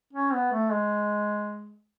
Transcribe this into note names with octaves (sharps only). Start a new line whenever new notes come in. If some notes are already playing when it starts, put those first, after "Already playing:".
C#4
B3
A3
G#3